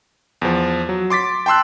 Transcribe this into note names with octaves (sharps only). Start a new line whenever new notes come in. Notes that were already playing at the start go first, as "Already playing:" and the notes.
E2 F3
F#3
C6 D6 A6 B6
G5 A5 C6 E6 F#6